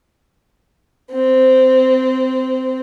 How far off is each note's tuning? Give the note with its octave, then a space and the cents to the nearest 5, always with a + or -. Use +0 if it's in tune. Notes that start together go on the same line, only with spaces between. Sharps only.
C4 -15